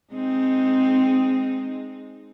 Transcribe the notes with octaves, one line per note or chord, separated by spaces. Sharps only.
G#3 C4 D#4